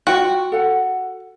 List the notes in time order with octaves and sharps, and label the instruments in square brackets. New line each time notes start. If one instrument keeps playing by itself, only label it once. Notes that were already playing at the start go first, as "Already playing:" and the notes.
[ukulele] F4 G5 [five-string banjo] F#4
[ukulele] A4 F#5